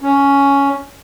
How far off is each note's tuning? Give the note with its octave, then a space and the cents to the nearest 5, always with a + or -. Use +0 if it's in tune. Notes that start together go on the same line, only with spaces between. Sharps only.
C#4 +10